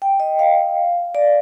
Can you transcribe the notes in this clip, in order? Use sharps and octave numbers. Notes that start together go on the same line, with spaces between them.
G5
D#5
F5
D5